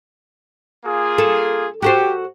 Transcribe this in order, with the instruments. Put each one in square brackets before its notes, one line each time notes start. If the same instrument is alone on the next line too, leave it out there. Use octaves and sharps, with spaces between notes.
[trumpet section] A#3 F4 G#4
[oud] A4
[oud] F#4 A4 C5 [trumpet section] G4